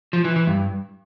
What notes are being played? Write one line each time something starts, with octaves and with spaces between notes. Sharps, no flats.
F3
E3
E3
G2